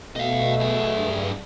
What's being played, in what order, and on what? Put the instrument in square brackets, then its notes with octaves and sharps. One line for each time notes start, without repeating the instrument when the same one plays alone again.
[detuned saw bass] B2 [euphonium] A3 [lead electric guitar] D#5 F5
[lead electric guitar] F#2 G#4
[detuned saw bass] G2